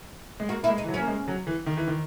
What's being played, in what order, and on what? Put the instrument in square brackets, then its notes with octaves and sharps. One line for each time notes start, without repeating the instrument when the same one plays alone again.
[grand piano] G#3
[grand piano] A#3 [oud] F#4
[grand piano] A#3 [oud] E4
[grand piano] G#3
[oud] D#4
[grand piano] E3
F#3
[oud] C#4
[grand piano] A#3
G#3
F#3
E3
D#3
E3
D#3